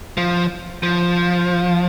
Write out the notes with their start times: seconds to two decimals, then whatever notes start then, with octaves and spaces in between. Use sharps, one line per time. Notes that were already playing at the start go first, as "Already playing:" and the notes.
0.18 F3
0.83 F3